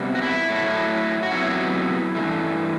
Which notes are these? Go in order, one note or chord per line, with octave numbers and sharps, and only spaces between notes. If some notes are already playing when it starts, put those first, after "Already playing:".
Already playing: C3 G3 B3
F#4
E4
A2 F#3 A3
F#4
C3 F#3 B3 E4
G2 E3 A3